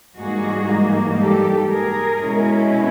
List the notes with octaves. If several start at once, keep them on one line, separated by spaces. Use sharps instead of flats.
G#2 E3 G3 A#3 D#4 F#4 G#4
G4 A4
G#4 A#4
B2 G#3 C#4 E4